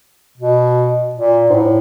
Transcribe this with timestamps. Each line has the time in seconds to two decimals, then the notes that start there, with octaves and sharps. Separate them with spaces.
0.37 B2
1.15 A#2
1.50 G#2
1.54 A2